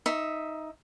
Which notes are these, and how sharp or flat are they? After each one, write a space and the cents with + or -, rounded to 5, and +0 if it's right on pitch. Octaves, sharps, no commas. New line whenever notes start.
D#4 +10 E5 +0 C#6 +0